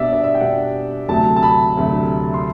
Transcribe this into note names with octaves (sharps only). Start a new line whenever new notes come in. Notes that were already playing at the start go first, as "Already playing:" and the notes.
Already playing: B2 G3 D4 D5 E5
D5
E5
G5
B2 G3 D4 F#5
D2 C3 F#3 A3 A5
A5
B5
D2 C3 F#3 A3
C6